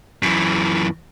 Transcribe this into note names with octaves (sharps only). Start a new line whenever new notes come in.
F#2 E3